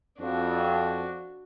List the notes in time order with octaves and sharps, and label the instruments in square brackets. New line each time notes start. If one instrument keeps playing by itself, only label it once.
[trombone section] F2 [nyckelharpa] D4 F#4